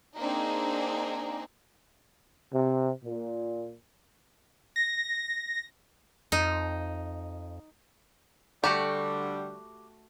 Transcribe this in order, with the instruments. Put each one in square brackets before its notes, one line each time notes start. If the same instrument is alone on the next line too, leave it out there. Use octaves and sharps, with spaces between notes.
[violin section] A#3 C4 D4 D#4 G#4
[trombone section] C3
A#2
[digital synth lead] A#6
[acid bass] F2 [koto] D#4
[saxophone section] D3 G3 [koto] A3 F#4 F#5 [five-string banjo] G4